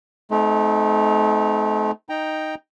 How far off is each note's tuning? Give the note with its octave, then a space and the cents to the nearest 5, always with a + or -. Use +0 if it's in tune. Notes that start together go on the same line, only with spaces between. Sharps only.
A3 -35 C4 -30 D#4 +0
D#4 +0 G5 +0 A#5 +0